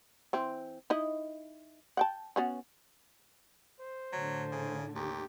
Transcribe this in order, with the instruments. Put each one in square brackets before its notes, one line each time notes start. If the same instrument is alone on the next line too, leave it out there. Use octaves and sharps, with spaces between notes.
[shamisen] E3 C4
D#4 E4 D#5
F#5 G5 A5
B3 C#4 F#4
[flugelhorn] C5
[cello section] A2 D3 [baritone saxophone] F#3
[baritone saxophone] C#3
[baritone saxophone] D#2 [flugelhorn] G4